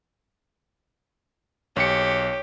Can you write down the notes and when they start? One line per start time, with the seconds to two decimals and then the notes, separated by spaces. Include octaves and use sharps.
1.76 B1 G4 C#5 C#7